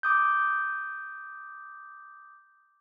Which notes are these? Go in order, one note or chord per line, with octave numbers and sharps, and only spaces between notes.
D6 D#6 G6